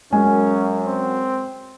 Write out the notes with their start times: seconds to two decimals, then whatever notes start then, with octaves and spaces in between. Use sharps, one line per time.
0.13 F#2 G#3 C#4 G#5
0.86 C4